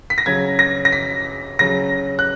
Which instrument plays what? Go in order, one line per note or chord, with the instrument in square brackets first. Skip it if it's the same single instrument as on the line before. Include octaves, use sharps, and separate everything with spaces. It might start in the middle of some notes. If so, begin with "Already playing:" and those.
[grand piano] B6
A#6
C#3 F#3 G#6
A#6
A#6
B6
C#3 F#3 A#6
F#6